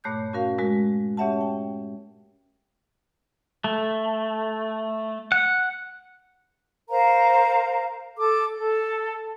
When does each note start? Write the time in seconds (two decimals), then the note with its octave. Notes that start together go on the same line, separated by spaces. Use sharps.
0.04 G2 A#2 A3 C#5 F#6 G6
0.33 C#4 F#4 A#4 F5
0.59 G#3 F#4 A#4
1.17 C#4 G4 C#5 E5 F#5 A5
1.41 G5
3.64 A3
5.32 F#5
6.90 A#4 C5 F5 A#5
8.18 A4 D6
8.56 A4